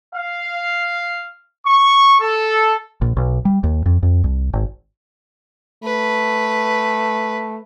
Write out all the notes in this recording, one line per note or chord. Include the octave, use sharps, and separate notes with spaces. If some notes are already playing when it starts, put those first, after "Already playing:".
F5
C#6
A4
A#1
B1
G3
D#2
F2
F2
C2
G#1
A3 B4